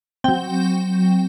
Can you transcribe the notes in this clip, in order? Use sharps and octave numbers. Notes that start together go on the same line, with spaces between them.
F#3 C4 G5